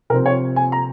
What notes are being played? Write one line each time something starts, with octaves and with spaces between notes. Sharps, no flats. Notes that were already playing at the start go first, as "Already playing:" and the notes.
C3 F3 C4 A#4
C#5
G#5
A#5